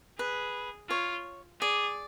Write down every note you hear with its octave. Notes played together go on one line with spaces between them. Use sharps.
G#4 B4
F4 C#5
G#4 D5